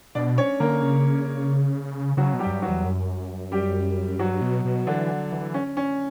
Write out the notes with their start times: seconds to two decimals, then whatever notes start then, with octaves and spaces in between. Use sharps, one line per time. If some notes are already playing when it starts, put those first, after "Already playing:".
0.15 B2 D4 D5
0.38 C#4 C#5
0.60 D3 A#3 A#4
0.82 C#3
2.17 C#3 F#3 F#4
2.34 B2
2.39 G3 G4
2.46 F#2
2.51 G2
2.62 F#3 F#4
2.68 E2
2.85 F#2
3.52 G3 G4
4.19 G2 F#3 F#4
4.42 B2
4.65 B2
4.87 D3 E3 D4
5.32 E3
5.54 C#4
5.77 C#4